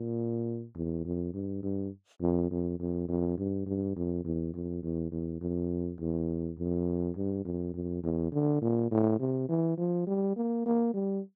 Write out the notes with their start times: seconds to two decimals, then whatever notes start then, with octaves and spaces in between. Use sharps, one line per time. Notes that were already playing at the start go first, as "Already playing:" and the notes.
Already playing: A#2
0.75 E2
1.05 F2
1.33 G2
1.63 G2
2.21 F2
2.51 F2
2.80 F2
3.08 F2
3.38 G2
3.66 G2
3.96 F2
4.25 E2
4.54 F2
4.83 E2
5.12 E2
5.41 F2
6.00 E2
6.58 F2
7.16 G2
7.45 F2
7.74 F2
8.04 E2
8.32 D3
8.62 A#2
8.91 A2
9.20 C3
9.49 E3
9.78 F3
10.07 G3
10.36 A#3
10.66 A#3
10.94 G3